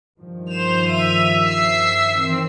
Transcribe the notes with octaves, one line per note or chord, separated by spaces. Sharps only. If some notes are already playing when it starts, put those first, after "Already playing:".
G2 D#3 F3
C5 E7 F7
E5 D#7 F7
E6 C7
D#3 E3 C4